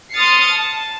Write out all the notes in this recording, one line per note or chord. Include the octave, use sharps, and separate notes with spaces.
C6 D#6 F6 A6 C7 C#7
A5